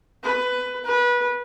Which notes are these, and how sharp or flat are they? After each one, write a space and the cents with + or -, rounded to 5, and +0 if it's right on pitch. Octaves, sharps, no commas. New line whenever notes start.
B4 +15
B4 -25